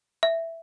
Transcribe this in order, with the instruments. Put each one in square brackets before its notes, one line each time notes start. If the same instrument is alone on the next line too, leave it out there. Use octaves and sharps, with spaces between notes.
[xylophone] E5